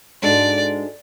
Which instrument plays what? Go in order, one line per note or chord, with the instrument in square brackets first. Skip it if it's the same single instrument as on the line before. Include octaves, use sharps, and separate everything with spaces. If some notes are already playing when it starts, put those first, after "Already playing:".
[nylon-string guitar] G#2 G#3 D4 F#4 A4 [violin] D5